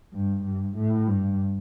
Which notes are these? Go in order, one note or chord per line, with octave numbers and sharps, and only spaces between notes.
G2
G2
A2
G2